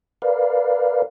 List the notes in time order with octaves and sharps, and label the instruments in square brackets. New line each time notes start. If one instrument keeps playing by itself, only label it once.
[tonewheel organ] A#4 B4 D5 F5